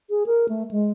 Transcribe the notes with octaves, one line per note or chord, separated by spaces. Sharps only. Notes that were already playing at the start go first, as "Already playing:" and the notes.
G#4
A#4
A3
G#3